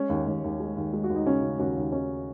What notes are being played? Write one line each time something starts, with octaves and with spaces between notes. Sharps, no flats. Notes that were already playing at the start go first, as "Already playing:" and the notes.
Already playing: G#3 C#4
D#2
D#2
D#2
G#3
D#2
G#3
F#4
D#2
D#4
C#3 C#4
C#3
D#2 C#4 F#4
D#2
D#2 C#4